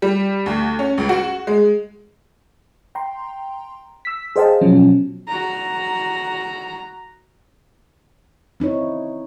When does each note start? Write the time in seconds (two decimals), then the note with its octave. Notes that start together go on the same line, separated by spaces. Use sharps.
0.02 G3
0.46 D2
0.79 C#4
0.98 C#2
1.09 F#4
1.47 G#3
2.95 G5 A#5 C6
4.05 E6 B6
4.36 G#4 C5 D#5 F5 G5 A5
4.61 B2 F3 F#3 C#4
5.28 F#4 A#5
8.60 C4 D#4 E4 C#5